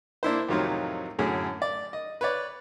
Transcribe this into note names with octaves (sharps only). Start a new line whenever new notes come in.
A#3 D4 E4 C5
F2 A2 C3 D#3 F#3 F4
F#2 A2 D3 G#4
D5
D#5
B4 C#5 D5